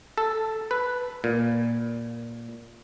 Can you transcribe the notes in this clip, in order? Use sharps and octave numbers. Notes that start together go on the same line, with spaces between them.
A4
B4
A#2